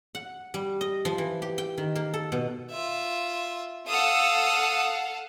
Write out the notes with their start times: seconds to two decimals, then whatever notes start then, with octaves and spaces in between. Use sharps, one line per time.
0.15 F#5
0.54 G3
0.81 D#5
1.05 F3
1.18 E3
1.42 G4
1.58 G5
1.78 D#3
1.96 A#3
2.14 A4
2.32 B2
2.71 F4 E5
3.88 A4 F5 F#5 D#6 E6